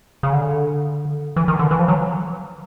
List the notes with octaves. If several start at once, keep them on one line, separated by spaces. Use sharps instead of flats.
C#3
D3
E3
D#3
D3
E3
F3
F#3